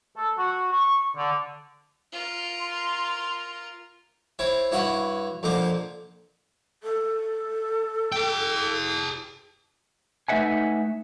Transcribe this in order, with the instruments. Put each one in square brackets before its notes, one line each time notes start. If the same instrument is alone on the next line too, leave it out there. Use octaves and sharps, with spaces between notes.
[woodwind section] A4
F#4
C#6
D3
[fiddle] F4 A#4
[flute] C6
[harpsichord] C4 E4 C#5
G2 E4 F#4 C#5 F#5
F2 A#2 D3 C5 D6
[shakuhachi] A4
[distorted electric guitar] G#4 G5
[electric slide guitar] A3 D#4 B4 E5 F#5 G#5